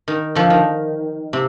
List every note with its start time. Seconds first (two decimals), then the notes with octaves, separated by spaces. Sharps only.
0.08 D#3
0.35 D3 F3
0.50 D#3
1.33 C3